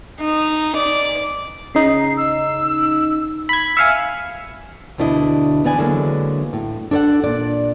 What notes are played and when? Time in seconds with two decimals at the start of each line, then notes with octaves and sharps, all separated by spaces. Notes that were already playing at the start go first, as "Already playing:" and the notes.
0.21 D#4
0.77 D5
1.75 C#3 D#4 C7
2.17 E6
3.49 B5 G#6
3.77 E5 F5 G#5 C#7
4.98 D2 B2 D4 E4 A4 D#5
5.64 E3 B3 D5 G#5
5.78 D3 E3 F#3 G#3 A#3
6.53 A2
6.91 D4 A4 C#5 D5 F#5
7.24 A#2 D5